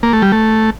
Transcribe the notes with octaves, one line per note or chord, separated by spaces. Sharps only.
A#3
A3
G3
A3